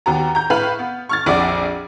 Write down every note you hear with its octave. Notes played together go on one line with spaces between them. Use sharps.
D#2 B3 F#4 A#5
A#5 G6
A2 B4 F5 F6 F#7
B3
C#6 F6 A6
A#1 F2 D5 F#5 D6